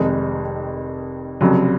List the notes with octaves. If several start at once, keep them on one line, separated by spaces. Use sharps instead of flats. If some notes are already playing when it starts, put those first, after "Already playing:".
Already playing: F1 F2 D#3 G#3 D#4
F1 F2 C#3 F#3